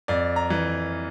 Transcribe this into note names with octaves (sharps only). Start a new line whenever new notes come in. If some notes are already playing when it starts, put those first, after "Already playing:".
F2 D5
A#5
E3